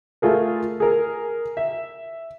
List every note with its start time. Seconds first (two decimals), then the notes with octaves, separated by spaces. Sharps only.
0.22 A3 F4 G#4 A#4
0.80 G#4 A#4
1.57 E5